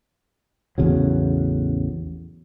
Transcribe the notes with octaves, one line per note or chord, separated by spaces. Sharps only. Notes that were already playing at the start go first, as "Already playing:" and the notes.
A1 E2 C#3 F#3